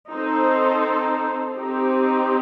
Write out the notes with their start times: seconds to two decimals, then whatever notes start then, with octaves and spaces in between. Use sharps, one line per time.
0.12 C4 D#4 A4 C5
1.59 C4 D#4 G4